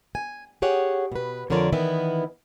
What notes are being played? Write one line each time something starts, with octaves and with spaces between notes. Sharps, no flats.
G#5
G4 G#4 C#5 F#5
B2 B4
F2 D3 F3 A#4 C#5 D5
D#3 E3 B3 E4